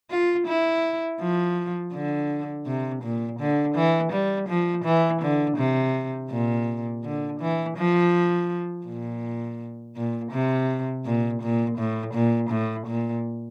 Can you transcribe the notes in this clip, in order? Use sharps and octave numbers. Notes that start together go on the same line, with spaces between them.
F4
E4
F3
D3
C3
A#2
D3
E3
G3
F3
E3
D3
C3
A#2
D3
E3
F3
A#2
A#2
C3
A#2
A#2
A2
A#2
A2
A#2